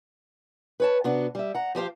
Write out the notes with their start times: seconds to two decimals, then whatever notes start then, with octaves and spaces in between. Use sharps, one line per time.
0.80 B4 C#5 A5
1.04 C3 B3 D4 F#4
1.35 G3 E5
1.54 F#5 A#5
1.75 F3 G4 C5 F5